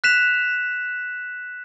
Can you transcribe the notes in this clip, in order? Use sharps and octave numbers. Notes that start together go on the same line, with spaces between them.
F#6 B6 E7 F7